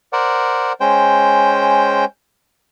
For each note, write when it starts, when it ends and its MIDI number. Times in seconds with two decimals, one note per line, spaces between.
0.13 0.73 70
0.13 0.73 72
0.13 0.73 74
0.13 0.73 78
0.81 2.05 56
0.81 2.05 61
0.81 2.05 72
0.81 2.05 79